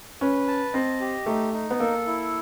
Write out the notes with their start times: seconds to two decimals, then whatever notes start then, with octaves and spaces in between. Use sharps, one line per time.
0.21 C#4 B4
0.48 A5
0.74 C4 D#5
1.00 G4
1.26 A3 D#4
1.53 D#4
1.70 B3
1.80 A#3 A4
2.06 E4